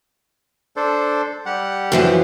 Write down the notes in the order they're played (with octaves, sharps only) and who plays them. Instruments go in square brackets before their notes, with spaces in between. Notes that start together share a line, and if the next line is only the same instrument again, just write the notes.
[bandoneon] D4 A4 C5
G3 G4 F#5
[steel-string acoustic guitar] F#2 E3 F3